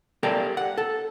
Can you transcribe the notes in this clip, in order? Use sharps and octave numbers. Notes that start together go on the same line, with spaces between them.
G4 A4 A#4 D5 F5 G5
F#5
A4